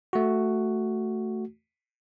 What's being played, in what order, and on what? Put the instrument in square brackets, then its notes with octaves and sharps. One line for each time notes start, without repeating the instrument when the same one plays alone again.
[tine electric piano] A3 F#4